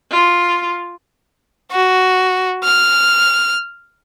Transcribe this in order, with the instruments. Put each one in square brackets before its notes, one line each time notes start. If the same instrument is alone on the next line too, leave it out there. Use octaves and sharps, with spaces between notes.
[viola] F4
[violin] F#4
F6